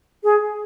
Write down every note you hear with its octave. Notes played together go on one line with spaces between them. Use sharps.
G#4